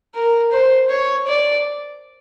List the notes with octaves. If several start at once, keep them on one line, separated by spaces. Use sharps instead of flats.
A#4
C5
C#5
D5